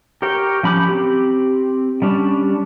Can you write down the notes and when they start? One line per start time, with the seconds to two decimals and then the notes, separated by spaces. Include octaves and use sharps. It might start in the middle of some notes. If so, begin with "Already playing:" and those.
0.22 G4 A#4 C#5 G5
0.63 F3 C#4 B5 D6 G6
0.89 C4 G4
2.02 G3 C#4 D4